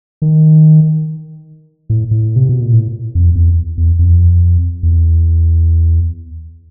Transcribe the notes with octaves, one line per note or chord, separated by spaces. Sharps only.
D#3
A2
A2
C3
B2
A#2
A2
F2
E2
E2
F2
E2